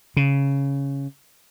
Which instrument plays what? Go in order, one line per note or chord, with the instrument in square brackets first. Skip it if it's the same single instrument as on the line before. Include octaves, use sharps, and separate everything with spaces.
[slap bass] C#3